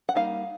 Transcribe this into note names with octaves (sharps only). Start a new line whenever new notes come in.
F#5
G3 A#3 D#4 F5